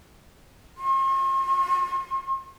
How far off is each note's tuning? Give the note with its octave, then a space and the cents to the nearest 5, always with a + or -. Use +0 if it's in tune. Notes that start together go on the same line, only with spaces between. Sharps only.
C6 +45